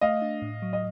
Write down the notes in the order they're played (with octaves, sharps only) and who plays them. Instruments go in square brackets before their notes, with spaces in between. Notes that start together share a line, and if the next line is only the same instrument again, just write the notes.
[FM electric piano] A3 [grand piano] D#5 F5
[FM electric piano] D4
A2
F#3
[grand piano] D#5